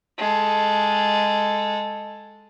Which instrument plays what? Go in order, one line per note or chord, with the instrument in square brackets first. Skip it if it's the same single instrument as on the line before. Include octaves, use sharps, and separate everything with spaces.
[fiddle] G#3 A4